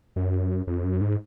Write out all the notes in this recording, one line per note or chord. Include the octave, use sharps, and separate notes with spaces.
F#2
F2
F#2
G#2